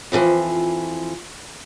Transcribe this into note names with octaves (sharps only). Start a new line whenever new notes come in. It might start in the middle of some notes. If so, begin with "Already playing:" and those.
F2 B2 D3 E3 F3